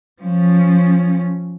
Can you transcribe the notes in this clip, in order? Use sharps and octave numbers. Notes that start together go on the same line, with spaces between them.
F3 C#4